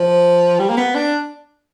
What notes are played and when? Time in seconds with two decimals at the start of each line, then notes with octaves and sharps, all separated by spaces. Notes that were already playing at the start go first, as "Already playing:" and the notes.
Already playing: F3
0.59 G3
0.70 A#3
0.77 B3
0.95 D4